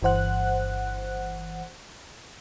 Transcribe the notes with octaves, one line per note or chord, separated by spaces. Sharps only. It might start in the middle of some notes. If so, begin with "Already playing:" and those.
G1 G2 E3 C5 F#5 F#6